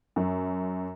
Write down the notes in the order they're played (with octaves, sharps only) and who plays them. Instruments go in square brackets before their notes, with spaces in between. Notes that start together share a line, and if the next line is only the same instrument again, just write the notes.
[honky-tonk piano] F#2